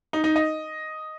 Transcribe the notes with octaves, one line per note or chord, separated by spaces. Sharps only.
D#4
D#4
D#5